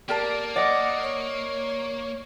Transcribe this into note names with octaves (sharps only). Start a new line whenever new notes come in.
A#3 G4 A#4 D5 A5
D5 D#5 F#5
C#5